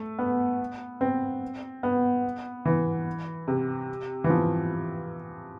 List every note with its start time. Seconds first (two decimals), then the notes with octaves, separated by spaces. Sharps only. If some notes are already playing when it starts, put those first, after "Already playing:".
Already playing: A3
0.19 B3
1.01 C4
1.83 B3
2.65 E3
3.48 C3
4.24 E3
4.30 F3